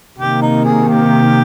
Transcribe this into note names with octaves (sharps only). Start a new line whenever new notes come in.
C3 D#3 A#3 G4
D#4
G#4
G4